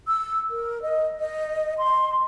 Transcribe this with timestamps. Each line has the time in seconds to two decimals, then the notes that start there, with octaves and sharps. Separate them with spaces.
0.08 E6
0.50 A#4
0.82 D#5
1.20 D#5
1.78 C6